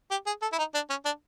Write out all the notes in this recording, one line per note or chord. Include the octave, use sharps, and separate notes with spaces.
G4
G#4
A4
E4
D#4
D4
C#4
D4